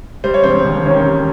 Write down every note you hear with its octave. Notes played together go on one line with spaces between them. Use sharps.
G3 C5
C#5
E1 C4 C5
D#2
D#3 C#4 C#5
G3